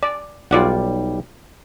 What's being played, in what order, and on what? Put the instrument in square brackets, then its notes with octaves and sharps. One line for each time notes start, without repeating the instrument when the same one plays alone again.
[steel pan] D5
[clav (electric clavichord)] B1 G3 [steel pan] F4 D5 F#5